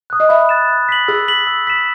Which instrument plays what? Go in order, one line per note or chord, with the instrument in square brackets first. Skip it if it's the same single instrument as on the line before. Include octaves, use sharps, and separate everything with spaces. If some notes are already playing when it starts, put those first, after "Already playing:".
[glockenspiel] D#6 F#6
[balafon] D#5
[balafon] E5 [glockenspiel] B5
[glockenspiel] F#6 A6 E7
F#6
B6 F#7
[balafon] G#4 [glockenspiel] E6
[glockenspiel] B6 F#7
E6
B6 E7